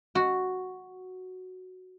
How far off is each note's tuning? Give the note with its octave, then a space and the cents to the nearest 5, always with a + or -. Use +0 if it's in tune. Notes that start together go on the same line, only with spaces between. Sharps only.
F#4 +0